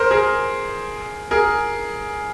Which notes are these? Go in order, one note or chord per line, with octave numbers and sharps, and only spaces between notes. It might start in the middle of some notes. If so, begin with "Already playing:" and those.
Already playing: A#4 C5
G#4 A#4
G#4 A#4